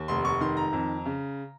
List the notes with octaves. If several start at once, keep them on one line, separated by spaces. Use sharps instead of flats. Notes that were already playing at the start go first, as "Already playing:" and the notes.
Already playing: D#2
F1 C6
C#6
D#3 C6
A#5
F2
C#3